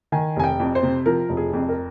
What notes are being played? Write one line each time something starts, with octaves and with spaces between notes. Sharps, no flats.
D#3 G#5
F1 G#5
G5
F2
C5
C3
F3 A#4
F1
G#4
F2
A#4